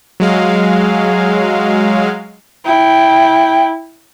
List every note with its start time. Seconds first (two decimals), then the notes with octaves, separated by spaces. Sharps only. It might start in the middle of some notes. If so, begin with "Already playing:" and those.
0.20 F#3 G#3 F5
2.65 E4 G5